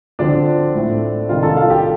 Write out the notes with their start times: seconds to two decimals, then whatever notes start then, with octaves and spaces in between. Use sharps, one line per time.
0.19 D3 F3 C4 D4 D5
0.74 A2 A3 C4
1.29 C3 D#3 G3 D4 F4 F5
1.43 A4 A5
1.57 F4 F5
1.70 G4 G5